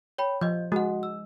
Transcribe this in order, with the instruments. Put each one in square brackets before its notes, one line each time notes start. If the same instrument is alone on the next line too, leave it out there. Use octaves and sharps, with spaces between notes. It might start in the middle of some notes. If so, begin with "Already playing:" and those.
[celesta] C#5 G5 B5
[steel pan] F3 [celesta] D#5 G6
[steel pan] G#3 [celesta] F#4 F#5
[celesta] E6